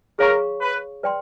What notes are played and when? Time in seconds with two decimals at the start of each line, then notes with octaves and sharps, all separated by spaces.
0.18 G#4 A#4 C#5 F5 A#5 C#6
0.61 B4
1.03 B4 D5 G5 C6